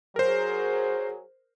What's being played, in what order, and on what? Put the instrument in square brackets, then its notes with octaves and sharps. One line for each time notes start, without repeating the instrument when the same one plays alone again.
[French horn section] F#3 G#4 [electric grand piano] A#4 C5